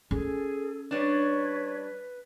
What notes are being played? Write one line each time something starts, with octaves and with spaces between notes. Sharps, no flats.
C#4 G#4 A4
G3 D4 B4 C#5